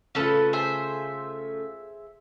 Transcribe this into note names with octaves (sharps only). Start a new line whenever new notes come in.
C#3 A3 C#4 F4 A4 B4
G#4 C5 E5